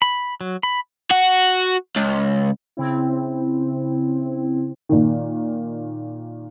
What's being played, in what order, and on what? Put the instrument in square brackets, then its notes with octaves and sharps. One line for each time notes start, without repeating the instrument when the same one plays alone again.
[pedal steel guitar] B5
F#3
B5
[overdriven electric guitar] F#4
C#2
[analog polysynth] C#3 C4 E4
[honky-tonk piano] A#2 D#3